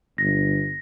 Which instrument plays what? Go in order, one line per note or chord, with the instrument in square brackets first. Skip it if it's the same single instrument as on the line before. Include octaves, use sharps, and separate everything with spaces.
[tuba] G1 [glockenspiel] A#6